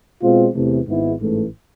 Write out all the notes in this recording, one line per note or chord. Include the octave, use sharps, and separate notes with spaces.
B2 G#3 C4 F4
E2 C3 E3 A3
G#1 G#2 G#3 B3 E4
A1 G#2 E3 A3